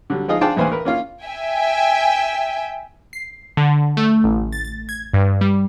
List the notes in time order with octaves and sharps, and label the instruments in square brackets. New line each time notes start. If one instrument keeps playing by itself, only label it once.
[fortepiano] D3 F#3 G3
F3 G#3 D#4 F4 G#4 D#5
D4 F4 G#4 C5 G5 A5
A1 D#2 E3 C5 F5 G#5
A#4 B4
A#3 C#4 F4 F5
[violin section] E5 G5 G#5
[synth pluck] C7
D3
A3
A1
A6
A6
G#6
G2
G3